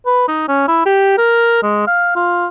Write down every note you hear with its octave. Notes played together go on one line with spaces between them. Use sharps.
B4
D#4
C#4
E4
G4
A#4
G#3
F5
F4